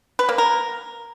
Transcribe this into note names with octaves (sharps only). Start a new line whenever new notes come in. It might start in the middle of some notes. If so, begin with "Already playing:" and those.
B4
A#3
A#4